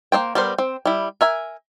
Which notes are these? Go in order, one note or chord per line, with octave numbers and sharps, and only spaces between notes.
A#3 D#4 C5 G5
G3 B3 A#4 C5
C4
G3 E4
A#4 E5 G#5